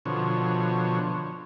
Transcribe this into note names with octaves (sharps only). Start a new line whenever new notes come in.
B2 D3 F3 C#5